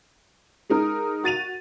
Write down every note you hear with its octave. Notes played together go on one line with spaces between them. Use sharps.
G#3 D#4 A#4
F#4 A6 D#7 F7